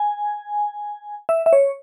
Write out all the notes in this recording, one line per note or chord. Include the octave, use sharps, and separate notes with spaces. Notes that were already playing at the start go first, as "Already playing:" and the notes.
Already playing: G#5
E5
E5
C#5